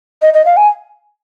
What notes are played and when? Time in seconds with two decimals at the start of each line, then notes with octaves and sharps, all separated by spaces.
0.22 D#5
0.34 D#5
0.46 F5
0.57 G#5